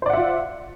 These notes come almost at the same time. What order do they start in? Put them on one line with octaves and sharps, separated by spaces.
C5 D5 F#5 E5 F4